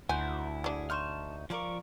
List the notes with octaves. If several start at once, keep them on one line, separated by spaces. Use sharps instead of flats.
D2 D#4 E4 F#4 C5 G#5
F#3 D4 G#4
D#4 A5 C6 C#6 F6
F3 A#4 D5 F5 C#6